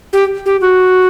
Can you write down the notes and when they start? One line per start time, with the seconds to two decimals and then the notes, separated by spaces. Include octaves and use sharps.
0.13 G4
0.46 G4
0.61 F#4